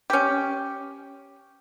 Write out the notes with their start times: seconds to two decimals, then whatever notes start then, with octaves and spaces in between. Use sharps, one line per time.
0.10 C#4 G4